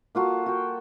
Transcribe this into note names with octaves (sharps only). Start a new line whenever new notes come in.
A#3 F4 F#4 A4
F#4 G5